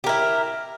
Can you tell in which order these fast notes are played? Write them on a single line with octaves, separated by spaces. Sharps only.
G4 A#4 E4